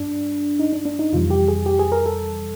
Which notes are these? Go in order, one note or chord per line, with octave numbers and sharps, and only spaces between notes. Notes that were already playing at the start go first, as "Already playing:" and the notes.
Already playing: G2 D4
D#4
D4
D4
D#4
F2 C3 E3 G3 F4
G4
G#4
G4
G#4
A#4
A4